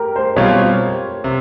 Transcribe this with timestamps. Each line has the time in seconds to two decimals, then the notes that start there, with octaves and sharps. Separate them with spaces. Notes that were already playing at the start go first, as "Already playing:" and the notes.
Already playing: G4 A#4
0.16 C5
0.36 B2 G3 C4 F4 C#5
1.24 C3